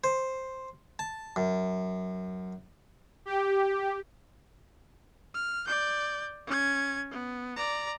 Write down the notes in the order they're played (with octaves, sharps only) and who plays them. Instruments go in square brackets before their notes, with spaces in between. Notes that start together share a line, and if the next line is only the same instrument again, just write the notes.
[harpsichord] C5
A5
F#2
[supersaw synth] G4
[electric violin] F6
D5 G6
C#4 G#6
B3
D5 A#5